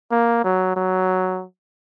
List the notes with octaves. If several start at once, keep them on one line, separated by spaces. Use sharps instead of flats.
A#3
F#3
F#3